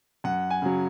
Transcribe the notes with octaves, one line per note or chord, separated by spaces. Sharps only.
F#2 F#5
G#5
C#3 F#3